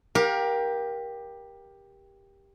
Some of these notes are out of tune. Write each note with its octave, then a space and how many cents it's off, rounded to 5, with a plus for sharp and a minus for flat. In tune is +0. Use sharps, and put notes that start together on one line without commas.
G4 +10 A#4 +20 F5 +35